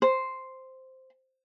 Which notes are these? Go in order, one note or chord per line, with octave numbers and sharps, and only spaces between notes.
C5